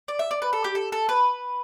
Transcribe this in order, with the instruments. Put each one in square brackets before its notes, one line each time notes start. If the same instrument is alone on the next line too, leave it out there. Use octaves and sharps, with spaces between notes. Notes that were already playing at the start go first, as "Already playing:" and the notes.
[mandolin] D5
E5
D5
B4
A4
G4
A4
A4
B4